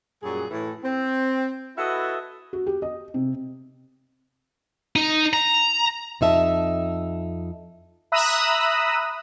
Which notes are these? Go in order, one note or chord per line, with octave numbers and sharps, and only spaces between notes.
F#2 A#2 F#3 G3 G#4
A2 E3
C4
E4 F#4 A4 B4 D#5 E5
F#4
G4
D#5
C3
D#4
A#5
F2 D#4 E5 A5
E5 A#5 B5 D#6 E6 F#6